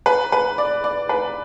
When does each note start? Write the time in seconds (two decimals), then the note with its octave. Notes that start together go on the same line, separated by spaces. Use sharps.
0.06 B4
0.32 B4
0.58 D5
0.84 D5
1.09 B4